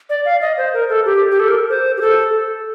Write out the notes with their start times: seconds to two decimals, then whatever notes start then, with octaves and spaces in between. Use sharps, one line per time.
0.10 D5
0.25 F5
0.41 D#5
0.58 C5
0.74 A#4
0.89 A4
1.05 G4
1.31 G4
1.40 A4
1.48 A#4
1.69 C5
1.97 G4
2.01 A4